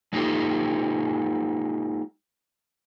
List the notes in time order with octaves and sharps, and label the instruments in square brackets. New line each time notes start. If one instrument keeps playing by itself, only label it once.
[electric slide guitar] G#3 A#3 D#4 F4 G4 A4